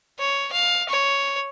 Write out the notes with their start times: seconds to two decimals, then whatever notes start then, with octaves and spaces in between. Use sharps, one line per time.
0.19 C#5
0.53 F5
0.89 C#5